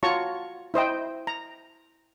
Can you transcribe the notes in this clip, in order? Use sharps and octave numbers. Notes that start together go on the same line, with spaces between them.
F4 F#4 C#5 A5 A#5 C#6
E4 C5 D#5 G5
A#5